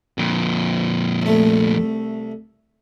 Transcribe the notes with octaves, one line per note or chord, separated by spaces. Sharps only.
F2 A#2
C2 A3